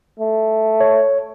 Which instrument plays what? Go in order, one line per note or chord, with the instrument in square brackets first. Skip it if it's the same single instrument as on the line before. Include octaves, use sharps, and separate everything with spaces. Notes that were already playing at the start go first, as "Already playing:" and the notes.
[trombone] A3
[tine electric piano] C#5